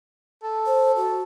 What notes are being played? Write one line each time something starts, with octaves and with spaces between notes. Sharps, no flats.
A4
C5
F#4